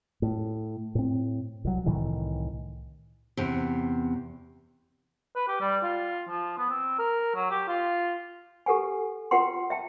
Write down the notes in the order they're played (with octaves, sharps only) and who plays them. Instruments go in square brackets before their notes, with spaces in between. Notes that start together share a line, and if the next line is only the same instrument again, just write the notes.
[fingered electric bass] A2
A2 C4
C2 F#3
C2 A2 D#3 E3
[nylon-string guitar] E2 C3
[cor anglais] B4
G4
G3
F4
F3
B3
C4
A#4
F#3
G4
F4
[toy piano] G4 A4 B4 F#5 G#5
F4 B4 F#5 G5 C6
E5 G5 A5